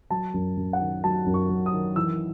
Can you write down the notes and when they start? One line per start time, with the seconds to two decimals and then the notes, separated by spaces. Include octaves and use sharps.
0.10 F#3 A5
0.34 F#2
0.57 F#2
0.73 F#5
0.81 D#3
1.04 F#3 A5
1.26 F#2
1.34 C#6
1.49 F#2
1.66 D#6
1.73 D#3
1.96 E3 E6